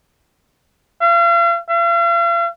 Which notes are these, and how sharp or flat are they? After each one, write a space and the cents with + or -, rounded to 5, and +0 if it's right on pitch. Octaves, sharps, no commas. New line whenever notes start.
F5 -40
F5 -45